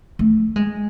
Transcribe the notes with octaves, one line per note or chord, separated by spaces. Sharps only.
A3
G#3